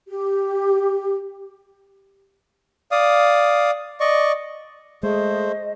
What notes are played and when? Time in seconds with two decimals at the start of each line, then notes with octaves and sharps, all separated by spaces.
0.08 G4
2.92 D5 F5 D#6
4.00 D5 D#5 C#6
5.03 G#3 A3 G#4 C5 D#5